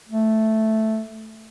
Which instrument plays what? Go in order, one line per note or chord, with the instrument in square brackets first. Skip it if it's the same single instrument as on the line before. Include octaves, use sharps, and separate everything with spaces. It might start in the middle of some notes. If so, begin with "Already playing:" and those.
[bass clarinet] A3